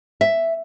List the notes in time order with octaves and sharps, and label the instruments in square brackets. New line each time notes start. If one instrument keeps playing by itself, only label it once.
[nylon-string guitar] E5